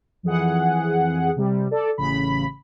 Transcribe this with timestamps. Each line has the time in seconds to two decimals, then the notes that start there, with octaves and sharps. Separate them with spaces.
0.23 F2 E3 G#4 F#5
1.36 C3 G3
1.71 A4 D5
1.98 A1 C#3 B5